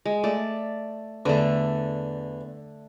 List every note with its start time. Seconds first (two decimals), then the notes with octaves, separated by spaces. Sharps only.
0.05 G#3
0.24 A3 D5
1.26 E2 D3 A3